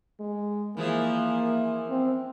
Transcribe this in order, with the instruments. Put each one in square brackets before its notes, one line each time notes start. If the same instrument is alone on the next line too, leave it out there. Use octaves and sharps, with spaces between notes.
[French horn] G#3
[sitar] E3 F3 G#4 [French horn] A#3
[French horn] C4